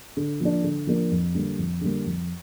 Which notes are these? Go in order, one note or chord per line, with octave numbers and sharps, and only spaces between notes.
D3
F3 A#3 D4
D3
F3 A#3 D4
F2
D3 G3 A#3
F2
D3 G3 A#3
F2